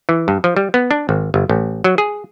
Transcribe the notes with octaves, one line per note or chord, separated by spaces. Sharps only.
E3
G2
F3
G3
B3
D4
G#1
G1
A1
F#3
G#4